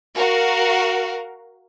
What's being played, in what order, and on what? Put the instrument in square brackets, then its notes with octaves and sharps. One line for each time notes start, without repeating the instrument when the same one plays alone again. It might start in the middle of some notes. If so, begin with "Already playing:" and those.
[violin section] F#4 A#4 F5